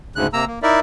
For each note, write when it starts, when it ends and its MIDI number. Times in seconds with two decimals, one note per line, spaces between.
0.16 0.27 38
0.16 0.27 44
0.16 0.27 49
0.16 0.27 90
0.33 0.45 48
0.33 0.45 58
0.33 0.45 82
0.33 0.45 88
0.47 0.59 58
0.62 0.80 63
0.62 0.80 64
0.62 0.80 70
0.62 0.80 74
0.62 0.80 76